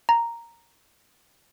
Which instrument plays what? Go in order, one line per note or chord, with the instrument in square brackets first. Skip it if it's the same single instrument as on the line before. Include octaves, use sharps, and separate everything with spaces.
[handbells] A#5